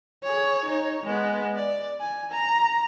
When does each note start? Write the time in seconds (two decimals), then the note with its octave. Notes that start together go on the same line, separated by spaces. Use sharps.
0.23 G#4 C#5
0.66 D#4 C#5
1.04 G#3 B3
1.56 D5
2.00 G#5
2.32 A#5